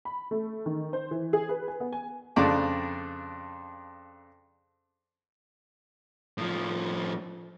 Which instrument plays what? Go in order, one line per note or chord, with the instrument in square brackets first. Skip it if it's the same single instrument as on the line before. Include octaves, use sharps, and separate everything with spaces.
[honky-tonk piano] B5
A3
D#3
C5
E3
G#4
B4
G#5
B3
G#5
[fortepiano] F2 C#3 D4 D6
[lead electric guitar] A2 F3